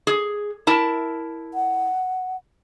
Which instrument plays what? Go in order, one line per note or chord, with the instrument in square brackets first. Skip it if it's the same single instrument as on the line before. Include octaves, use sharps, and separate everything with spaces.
[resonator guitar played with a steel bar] G#4
E4 A#4 A5
[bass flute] F#5